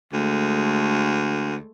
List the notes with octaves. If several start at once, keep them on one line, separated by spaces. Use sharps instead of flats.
D2 G#3 A3